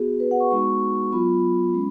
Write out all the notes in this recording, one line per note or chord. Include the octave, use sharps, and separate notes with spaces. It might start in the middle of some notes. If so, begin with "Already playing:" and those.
Already playing: B3 F#4 G#4
B4
F#5
C#6
G#3 B3 D#4 F#4 C#6
F#3 B3 F4 B5
G#3 C#4